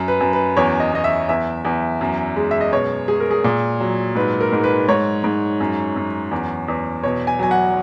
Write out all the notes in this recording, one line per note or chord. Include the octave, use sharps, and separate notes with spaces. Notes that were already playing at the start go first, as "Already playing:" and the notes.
Already playing: F#2
B4
F#2
B4
E2 C#5
D#5
E2 D#5
E5
E2 E5
E2
F#2
G#3
E5
D#5
B2 C#5
G#3 G#4
A#4
G#4
A#2
F#3
G#2 B4
A#4
G#2
B4
G#2 C#5
G#2
F#2
F#2
E2
E2
B2 C#5
G#5
F#3 G#5
F#5